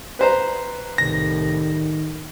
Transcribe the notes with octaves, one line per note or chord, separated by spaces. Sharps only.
B4 C5 A#5
C2 A2 D#3 A#6